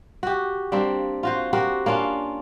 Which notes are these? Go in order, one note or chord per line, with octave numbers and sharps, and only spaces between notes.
F#4 G4
G3 A#3 C4 D4
F4 F#4 C5
F#4 G4 A#4 C5
A#3 C#4 D4 F4